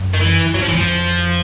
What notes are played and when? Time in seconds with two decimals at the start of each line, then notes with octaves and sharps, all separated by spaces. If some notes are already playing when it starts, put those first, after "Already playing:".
Already playing: F#2
0.14 D#3
0.21 E3
0.54 F#2 F#3
0.62 F2 F3
0.69 E3
0.73 E2
0.76 F3
0.81 F2